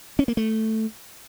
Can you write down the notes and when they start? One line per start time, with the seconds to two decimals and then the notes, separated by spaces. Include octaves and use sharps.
0.19 C#4
0.28 A#3
0.37 A3